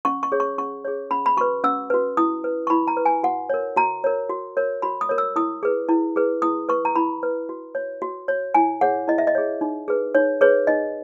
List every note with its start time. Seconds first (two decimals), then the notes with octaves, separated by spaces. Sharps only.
0.05 C#4 C#6
0.23 C#6
0.32 G#4 C#5
0.40 C#6
0.58 C#4 C#6
0.85 G#4 C#5
1.11 C#4 B5
1.26 B5
1.37 F#4 B4 C#6
1.64 C#4 E6
1.90 F#4 B4
2.17 E4 D#6
2.44 B4
2.67 C#6
2.70 E4 B5
2.88 A#5
2.97 B4
3.06 G#5
3.23 F#4 F#5
3.49 A#4 C#5
3.76 F#4 A#5
4.04 A#4 C#5
4.30 F#4
4.57 A#4 C#5
4.82 F#4 B5
5.01 D#6
5.09 A#4 C#5
5.18 E6
5.36 E4 D#6
5.63 G#4 B4
5.89 E4
6.16 G#4 B4
6.42 E4 D#6
6.69 B4 C#6
6.85 A#5
6.95 E4 B5
7.23 B4
7.49 F#4
7.75 C#5
8.02 F#4
8.28 C#5
8.54 E4 G#5
8.81 G#4 C#5 F#5
9.08 E4 D#5
9.18 E5
9.27 D#5
9.35 G#4 C#5
9.61 D#4
9.88 G#4 B4
10.15 D#4 C#5
10.41 G#4 B4 C#5
10.67 D#4 D#5